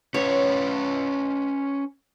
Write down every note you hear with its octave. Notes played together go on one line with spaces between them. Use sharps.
C#4 B4 C#5